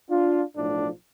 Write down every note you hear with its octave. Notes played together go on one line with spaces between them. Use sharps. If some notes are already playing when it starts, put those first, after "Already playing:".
D4 F4
B1 A2 F3 A3 D4